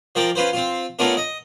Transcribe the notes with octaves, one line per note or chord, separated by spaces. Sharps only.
F3 A#4 D5 G5 D6
C#4 F4 B4 C5
C4 F4
A3 B3 C#4 D4 F4 A#4
D#5